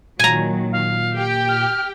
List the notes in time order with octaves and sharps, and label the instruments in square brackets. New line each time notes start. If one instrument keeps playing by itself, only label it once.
[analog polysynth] A#2 [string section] D#3 F#3 [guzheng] G#5 A#5
[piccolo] F5
[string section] G4 G5
[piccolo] F6